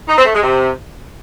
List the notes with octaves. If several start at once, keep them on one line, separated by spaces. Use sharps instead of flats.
D#4
C4
A3
G#3
C3